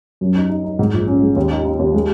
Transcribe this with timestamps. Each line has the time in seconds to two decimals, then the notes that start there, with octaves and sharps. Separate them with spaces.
0.21 F#2
0.36 D#4
0.50 D#4
0.64 D#4
0.79 G#2
0.94 A#1
1.08 C#4
1.22 G#3
1.36 D#2
1.51 D#4
1.65 D#4
1.79 D#2
1.94 G#3